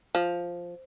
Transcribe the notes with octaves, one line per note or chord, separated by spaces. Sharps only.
F3